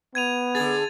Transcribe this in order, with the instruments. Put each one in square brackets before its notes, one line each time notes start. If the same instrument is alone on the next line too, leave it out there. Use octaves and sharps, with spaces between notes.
[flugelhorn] B3 [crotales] G#6 D#7 F7
[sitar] D3 G#4 [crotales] A6